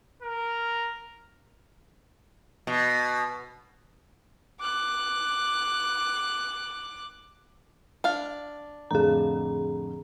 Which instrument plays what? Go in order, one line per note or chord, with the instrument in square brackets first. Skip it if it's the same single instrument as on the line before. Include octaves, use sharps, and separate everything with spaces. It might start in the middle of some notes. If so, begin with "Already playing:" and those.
[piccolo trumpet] A#4
[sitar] B2
[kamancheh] D6 F#6
[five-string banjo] D4 F5
[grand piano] F2 A2 D3 [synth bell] G#4 A#5